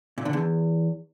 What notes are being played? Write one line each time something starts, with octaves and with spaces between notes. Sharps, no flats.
A#2
D3
E2